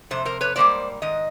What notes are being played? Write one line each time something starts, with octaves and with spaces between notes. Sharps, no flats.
F2 C3 C5
A#4 C5
B4 C#5
G#2 D#3 G3 A#3 C5 D5
G#2 D#3 D#5